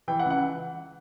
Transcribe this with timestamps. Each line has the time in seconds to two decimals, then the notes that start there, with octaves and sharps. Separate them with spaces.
0.08 E3 G5
0.19 F#5
0.25 C#2
0.30 F#5